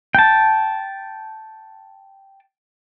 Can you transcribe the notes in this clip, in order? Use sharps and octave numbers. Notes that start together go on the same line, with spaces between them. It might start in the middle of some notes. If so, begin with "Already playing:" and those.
G5 A5